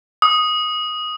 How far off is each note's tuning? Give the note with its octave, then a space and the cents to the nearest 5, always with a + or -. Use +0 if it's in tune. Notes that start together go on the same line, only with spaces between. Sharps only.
D#6 +0